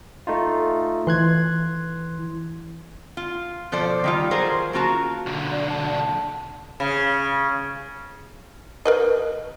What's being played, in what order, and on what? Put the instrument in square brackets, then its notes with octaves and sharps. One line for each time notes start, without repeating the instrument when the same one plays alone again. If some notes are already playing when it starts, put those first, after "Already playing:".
[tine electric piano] A3 D#4 F4
[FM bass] E3 [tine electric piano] C6 F#6 G#6
[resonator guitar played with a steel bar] F4
B2 F3 A4 C5 D5
D#3 G3 F4
F#3 F4 G#4 A#4 C5
A#3 C#4 F4 F#4 A#4 A5
[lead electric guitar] B1 D3
[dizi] D5
A5
[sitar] C#3
[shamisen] A#4 B4 D#5